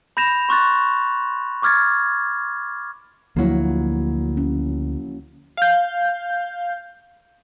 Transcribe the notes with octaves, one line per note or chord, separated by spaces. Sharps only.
B5 G6 A#6 E7 F7
C6 C#6 F#6 A6
C#6 D6 F6 G#6 A6
D2 F3 F#3 A#3 E4
C#4
F5 G6